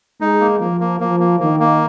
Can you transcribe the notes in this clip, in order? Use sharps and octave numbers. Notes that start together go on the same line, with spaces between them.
G#3 D#4
A#3
F3 A#3
A#3
F3 A#3
A#3
D#3 A#3
A#3